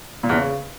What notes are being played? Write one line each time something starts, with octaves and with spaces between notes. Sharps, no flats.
A#2
E2
C#3